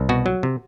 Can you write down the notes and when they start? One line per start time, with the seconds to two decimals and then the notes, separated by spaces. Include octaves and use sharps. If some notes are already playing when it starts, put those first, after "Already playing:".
Already playing: C2
0.09 B2 F#4
0.26 F#3
0.43 C3